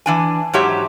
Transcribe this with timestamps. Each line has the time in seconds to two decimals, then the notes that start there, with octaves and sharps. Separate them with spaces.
0.06 E3 D4 G#5
0.53 G#2 F#3 G4 C#5 E5